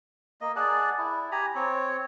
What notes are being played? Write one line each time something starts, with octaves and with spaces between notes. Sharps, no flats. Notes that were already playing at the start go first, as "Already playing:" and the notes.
A#3 D#5
G#4 D5 F#5 A5
E4
G4 G#5 A#5 B5
C4 C#5